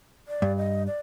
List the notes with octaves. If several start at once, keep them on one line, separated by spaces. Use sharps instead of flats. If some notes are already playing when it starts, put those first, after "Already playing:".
D5
G2
D#5
D5